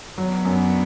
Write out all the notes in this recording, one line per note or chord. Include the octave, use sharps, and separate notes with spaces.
F#3 B3 D4
F#2